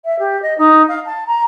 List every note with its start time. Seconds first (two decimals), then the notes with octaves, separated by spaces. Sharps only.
0.05 E5
0.19 G4
0.42 D#5
0.58 D#4
0.88 F5
1.06 A5
1.27 A#5